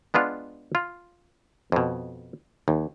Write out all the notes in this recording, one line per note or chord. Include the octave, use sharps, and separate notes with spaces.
G#3 B3 D4 F4
F4
F2 B2
D#2